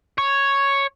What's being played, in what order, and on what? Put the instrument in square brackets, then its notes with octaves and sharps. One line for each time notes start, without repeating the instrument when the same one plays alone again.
[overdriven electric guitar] C#5